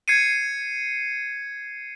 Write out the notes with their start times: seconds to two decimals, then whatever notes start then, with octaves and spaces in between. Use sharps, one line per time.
0.08 G#6 C7 C#7 D#7